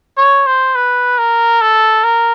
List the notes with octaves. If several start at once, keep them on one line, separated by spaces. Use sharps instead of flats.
C#5
C5
B4
A#4
A4
A#4